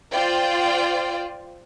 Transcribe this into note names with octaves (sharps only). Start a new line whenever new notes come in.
F4 C5 D5 G5